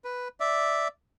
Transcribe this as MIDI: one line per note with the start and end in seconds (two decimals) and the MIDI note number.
0.04 0.28 71
0.40 0.88 74
0.40 0.88 76